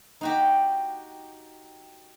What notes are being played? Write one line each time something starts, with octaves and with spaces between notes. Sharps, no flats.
D#4 F#4 G4